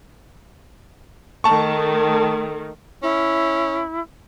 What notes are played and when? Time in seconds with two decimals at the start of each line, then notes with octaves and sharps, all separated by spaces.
1.44 D#3 A3 A5 C#6
3.03 C#4 E4